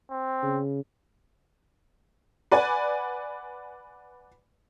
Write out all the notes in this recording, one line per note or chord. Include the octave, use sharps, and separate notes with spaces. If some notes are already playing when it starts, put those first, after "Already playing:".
C4
C#3
B4 D5 F#5 G#5